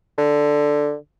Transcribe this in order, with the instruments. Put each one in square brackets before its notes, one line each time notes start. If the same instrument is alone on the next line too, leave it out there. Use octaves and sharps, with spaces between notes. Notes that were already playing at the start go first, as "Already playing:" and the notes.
[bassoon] D3